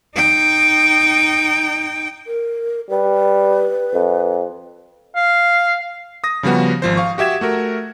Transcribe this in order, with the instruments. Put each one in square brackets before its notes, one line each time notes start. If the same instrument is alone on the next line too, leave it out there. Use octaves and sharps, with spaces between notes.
[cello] D#4 G5
[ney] A#4
[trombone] G3 [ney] B4
[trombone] F2
[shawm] F5
[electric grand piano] D#6 A#6
C#3 F3 G3 B3 F#4
G#1 F3 C5
F5 C#6
F#4 G4 E5 G#6 E7
A3 F#4 A#4